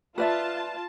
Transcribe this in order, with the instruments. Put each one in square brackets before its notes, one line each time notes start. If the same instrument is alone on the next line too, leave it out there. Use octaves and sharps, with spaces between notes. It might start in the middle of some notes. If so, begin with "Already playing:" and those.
[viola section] F4 A5 [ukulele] B4 D5 E5